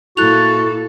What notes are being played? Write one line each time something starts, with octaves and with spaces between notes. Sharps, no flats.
A#2 E4 F#4 A4 F#6 F7